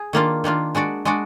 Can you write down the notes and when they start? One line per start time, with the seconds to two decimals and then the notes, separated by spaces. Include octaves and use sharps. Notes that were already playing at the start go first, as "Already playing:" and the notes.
Already playing: G#4
0.13 D#3 A#3 D4 F4
0.44 D#3 A#3 D4 F4
0.75 G#3 D4 F#4 D5
1.05 G#3 D4 F#4 D5